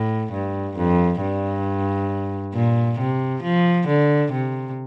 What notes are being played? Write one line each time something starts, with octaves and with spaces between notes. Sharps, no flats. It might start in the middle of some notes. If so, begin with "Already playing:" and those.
Already playing: A2
G2
F2
G2
A#2
C3
F3
D3
C3